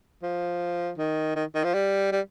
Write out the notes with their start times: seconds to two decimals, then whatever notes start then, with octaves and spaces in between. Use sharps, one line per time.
0.23 F3
0.98 D#3
1.36 D#3
1.55 D#3
1.64 F3
1.74 G3
2.12 G3